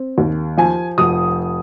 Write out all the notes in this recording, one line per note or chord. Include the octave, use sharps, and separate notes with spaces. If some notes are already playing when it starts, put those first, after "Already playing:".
Already playing: C4
D#2
F3 G#5
F1 D#6